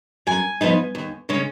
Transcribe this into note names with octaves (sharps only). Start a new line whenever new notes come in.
F#2 G#5
F3 B3 D#4
D#2
C#3 G#3 C#4